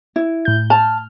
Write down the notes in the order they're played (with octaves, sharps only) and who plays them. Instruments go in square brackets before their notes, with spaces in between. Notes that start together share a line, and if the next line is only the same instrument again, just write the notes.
[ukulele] E4
[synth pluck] A2 G6
[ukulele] A5 [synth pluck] F6